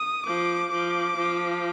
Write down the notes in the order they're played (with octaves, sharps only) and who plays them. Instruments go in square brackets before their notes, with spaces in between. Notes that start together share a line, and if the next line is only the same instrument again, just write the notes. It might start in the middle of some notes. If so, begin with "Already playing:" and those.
Already playing: [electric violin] D#6
[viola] F3 [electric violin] D6
[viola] F3 [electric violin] D6
[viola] F3